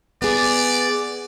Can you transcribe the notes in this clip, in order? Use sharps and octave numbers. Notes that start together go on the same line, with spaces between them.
B3 G#4 D5